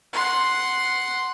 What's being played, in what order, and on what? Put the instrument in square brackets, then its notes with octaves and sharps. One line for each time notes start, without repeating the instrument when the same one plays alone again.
[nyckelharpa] F#5 C6